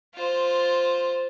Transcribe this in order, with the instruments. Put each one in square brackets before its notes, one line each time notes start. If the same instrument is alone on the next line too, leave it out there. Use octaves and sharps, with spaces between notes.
[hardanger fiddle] F4 C5